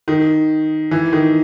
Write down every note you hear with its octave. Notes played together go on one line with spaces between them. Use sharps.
D#3
E3
D#3